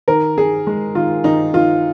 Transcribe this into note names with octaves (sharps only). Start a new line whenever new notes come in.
D#3 A#4
D#3 G#4
G#3
D#3 F4
D#3 D#4
D#3 F4